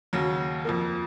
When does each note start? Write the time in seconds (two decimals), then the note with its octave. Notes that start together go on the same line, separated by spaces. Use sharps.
0.13 D#2 C#3 F#3
0.65 F2 F3 A#3